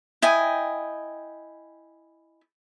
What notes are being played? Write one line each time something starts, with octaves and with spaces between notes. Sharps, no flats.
E4 D#5 G5 G#5